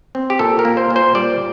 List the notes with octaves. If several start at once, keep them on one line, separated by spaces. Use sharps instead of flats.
C4
G4
A#2 A4
A#4
A#3
C5
A#2
C5
G3 D5